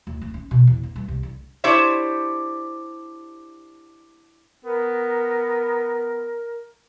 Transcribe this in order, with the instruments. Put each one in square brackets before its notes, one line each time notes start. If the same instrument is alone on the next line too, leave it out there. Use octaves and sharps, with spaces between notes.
[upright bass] D2
C4
C#4
B2
E2
D3
G2
C2
D3
[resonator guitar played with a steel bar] D4 E4 G4 C5 C#5 E5
[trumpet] B3 [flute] A#4